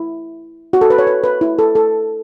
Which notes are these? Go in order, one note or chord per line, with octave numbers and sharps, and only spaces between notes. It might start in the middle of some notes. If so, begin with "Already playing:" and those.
Already playing: E4
F#4
A4
B4
C#5
B4
B4
E4
A4
A4